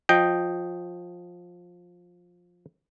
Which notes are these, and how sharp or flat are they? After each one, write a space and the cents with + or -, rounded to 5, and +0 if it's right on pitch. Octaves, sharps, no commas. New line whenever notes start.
F3 +15 D#5 +0 G5 +0